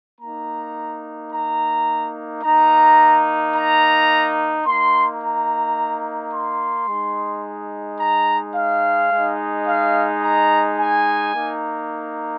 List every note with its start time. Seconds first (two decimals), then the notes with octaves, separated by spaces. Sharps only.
0.21 A#3 D#4 A#5
1.33 A#5
2.44 A#3 D#4 A#5
3.56 A#5
4.66 A#3 D#4 C6
5.22 A#5
6.34 C6
6.89 G#3 D#4
8.00 A#5
8.56 F5
9.12 G#3 D#4
9.67 F5
10.23 A#5
10.79 G#5
11.35 A#3 D#4